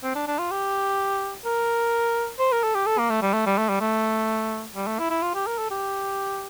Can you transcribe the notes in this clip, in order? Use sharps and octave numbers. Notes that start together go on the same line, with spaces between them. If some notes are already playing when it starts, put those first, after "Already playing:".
C4
D4
D4
F4
G4
A#4
C5
A#4
A4
G4
A4
A#3
A3
G3
A3
G3
A3
G3
A3
G3
A3
E4
E4
F4
G4
A#4
A4
G4